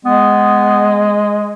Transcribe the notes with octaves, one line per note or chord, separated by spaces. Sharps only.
G#3 B3